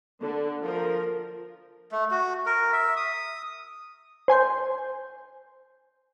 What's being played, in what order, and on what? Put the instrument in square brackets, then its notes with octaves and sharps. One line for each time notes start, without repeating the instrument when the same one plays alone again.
[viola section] D3
F3 A#4
[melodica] A3
F#4
A#4
E5
D#6
[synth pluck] C5 G#5 C6 G6